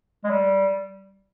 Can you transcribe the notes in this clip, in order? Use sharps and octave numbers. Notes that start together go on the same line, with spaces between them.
G#3
G3